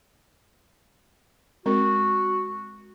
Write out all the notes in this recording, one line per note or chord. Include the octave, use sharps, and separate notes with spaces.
G#3 C4 F#4 A#4